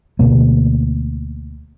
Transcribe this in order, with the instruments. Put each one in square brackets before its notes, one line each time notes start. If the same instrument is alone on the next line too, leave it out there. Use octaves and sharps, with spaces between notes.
[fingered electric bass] D2 B2 A#3